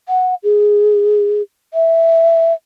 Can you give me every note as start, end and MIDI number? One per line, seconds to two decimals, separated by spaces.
0.09 0.35 78
0.44 1.42 68
1.74 2.53 76